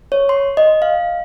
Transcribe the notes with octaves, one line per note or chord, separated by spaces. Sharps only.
C#5
C6
D#5
F5